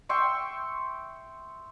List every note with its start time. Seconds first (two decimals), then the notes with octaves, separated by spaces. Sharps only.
0.09 E5 G5 C6 C#6